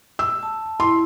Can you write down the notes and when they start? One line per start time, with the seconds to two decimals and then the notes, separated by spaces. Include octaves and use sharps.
0.19 E6
0.43 A5
0.80 E4 C6